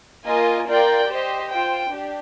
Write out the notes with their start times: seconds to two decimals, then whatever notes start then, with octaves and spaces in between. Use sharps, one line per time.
0.26 A#3 F4 A#4 D#5 G#5
0.68 F4 A#4 D5 G5
1.08 G4 C5 D#5
1.49 F4 C5 G5
1.91 D4 G4